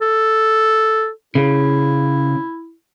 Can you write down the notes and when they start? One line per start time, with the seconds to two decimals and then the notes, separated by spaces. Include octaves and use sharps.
0.01 A4
1.35 C#3 E4